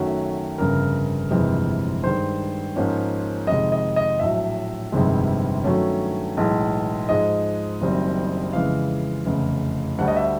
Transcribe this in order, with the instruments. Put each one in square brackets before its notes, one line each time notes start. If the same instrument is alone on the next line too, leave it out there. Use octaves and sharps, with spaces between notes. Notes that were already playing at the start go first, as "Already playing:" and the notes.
Already playing: [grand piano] F#2 D#3 F#3 A3 C#4
G1 F2 C#3 A#4
G1 F2 C3 E3 G#3
G2 D#3 G#3 C5
G#2 F3 A#3 C#4
F2 C3 D#3 G#3 D#5
D#5
D#5
A#1 A2 F#3 E5
G1 F2 C3 D#3 G#3
G2 D#3 F#3 A3 C#4
B1 A2 E3 G#3
G#2 F3 G#3 D#5
F#1 F#2 D#3 G3 C4
F2 C#3 E3 G#3 F5
F1 E2 C#3 E3
D2 D3 G3 F#5
D#5
E5